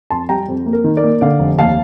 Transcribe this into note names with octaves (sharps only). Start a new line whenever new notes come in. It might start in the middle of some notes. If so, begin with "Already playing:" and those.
F2 A5 C6
G3 G5 A#5
F2
A#3
A#4
D#3
A#4 D5
A#3
D3 D5 F5
F1
D#2 F5 A5